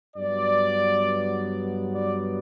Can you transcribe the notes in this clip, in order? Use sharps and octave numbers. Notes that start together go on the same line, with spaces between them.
G2 F#3 B3 D5
D5